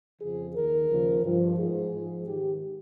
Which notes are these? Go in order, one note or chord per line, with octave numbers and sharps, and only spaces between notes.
F2 C#3 F3 G#4
D#2 D#3 A#4
D#2 C#3 F3
G2 F3
G#2 F3 G#4
G#2 F3
G#2 D#3 G4